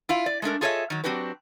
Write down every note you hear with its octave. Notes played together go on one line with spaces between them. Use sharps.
E4 F4 F5
D5
G#3 A3 D4 A#4
F4 G#4 A4 C#5 D#5 E5
D#3 F#3
F#3 C4 D4 F#4 G4 B4